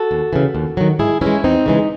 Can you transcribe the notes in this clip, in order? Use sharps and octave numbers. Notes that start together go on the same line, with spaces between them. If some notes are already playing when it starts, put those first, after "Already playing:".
Already playing: F#4 A4
D#2
C#3 E3
D#2
D#3 F#3
G#2 E4 G#4
E3 G#3 C#4 E4
E2 C4 D#4
C#3 E3 G#3